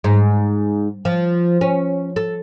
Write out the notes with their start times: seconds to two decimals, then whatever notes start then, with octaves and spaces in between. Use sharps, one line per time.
0.04 G#2
1.05 F3
1.61 C#4
2.16 A4